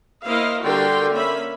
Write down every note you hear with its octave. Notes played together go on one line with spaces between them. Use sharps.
A#3 E4 C5 D#5 F5
D3 G3 F#4 A#4 G5 C6
A#3 C#4 E5 B5